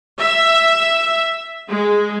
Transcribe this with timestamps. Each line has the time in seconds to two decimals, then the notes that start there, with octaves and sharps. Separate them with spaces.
0.19 E5
1.70 G#3